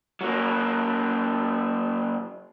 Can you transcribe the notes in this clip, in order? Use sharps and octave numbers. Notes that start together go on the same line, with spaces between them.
F#3 A#3